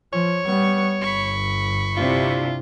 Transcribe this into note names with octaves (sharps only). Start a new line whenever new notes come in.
F3 C#5
G3 B3 C#6
G1 B5 C#6
C3 D4 E4 F4